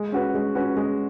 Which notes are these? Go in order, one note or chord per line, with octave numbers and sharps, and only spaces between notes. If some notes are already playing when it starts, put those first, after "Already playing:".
Already playing: G#3
C#4 F#4 B4
G#3
C#4 F#4 B4
G#3